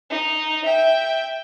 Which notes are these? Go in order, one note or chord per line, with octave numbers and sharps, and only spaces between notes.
D#4
E5 G5